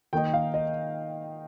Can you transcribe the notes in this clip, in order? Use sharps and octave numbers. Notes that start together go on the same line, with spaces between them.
D#3 A#3 D#4 G5
F5
D#5